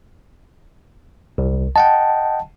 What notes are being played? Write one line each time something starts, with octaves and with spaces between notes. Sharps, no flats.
C2
D#5 F#5 G5 A5